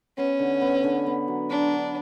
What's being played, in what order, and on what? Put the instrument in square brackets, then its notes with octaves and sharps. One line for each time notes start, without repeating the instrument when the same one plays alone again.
[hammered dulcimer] B3 [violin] C#4
[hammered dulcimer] D3
B3
D3
B3
F#3
[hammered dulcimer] F#3 [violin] D4
[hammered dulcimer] B3